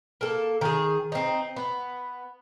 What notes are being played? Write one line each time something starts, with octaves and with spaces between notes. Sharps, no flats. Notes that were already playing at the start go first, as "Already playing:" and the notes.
A#3 A4
D#3 G#4
C4 D#4
B3